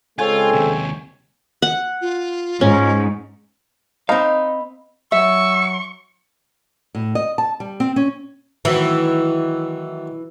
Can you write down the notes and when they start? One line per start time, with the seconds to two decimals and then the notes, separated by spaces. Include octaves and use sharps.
0.19 C#3 G#3 C4 F4 A4 C#5 G#5
0.53 D#2 C3
1.62 F#5
2.01 F4
2.61 G#2 C#4
4.09 C4 D#4 D#5 F5 B5
5.12 F#3 E5 C#6 E6
6.95 A2
7.15 D#5
7.38 A5
7.60 G3
7.80 C4
7.96 C#4
8.65 D#3 E3 F#3 A3